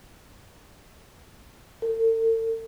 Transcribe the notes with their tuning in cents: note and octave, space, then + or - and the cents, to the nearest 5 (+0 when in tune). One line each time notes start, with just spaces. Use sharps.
A4 +45